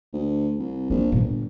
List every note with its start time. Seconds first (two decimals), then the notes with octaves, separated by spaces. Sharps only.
0.13 D2
0.59 C2
0.90 A#1 F4
1.12 G1 A#2